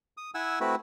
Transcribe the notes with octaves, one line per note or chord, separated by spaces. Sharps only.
D#6
E4 F#5 G#5 E6
A3 C4 E4 F#4 B4